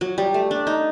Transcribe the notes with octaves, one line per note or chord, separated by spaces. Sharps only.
F#3
G3
A3
D4
D#4